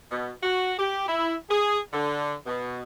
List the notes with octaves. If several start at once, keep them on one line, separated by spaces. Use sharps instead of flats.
B2
F#4
G4
E4
G#4
D3
B2